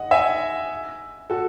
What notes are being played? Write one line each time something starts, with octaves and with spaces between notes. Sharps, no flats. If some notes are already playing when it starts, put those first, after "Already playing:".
Already playing: D#5 F#5
E5 G#5
F#4 A4